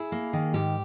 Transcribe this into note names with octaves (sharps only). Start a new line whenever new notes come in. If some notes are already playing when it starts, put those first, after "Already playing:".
Already playing: E4 G#4
A#3
D#3
G#2 G4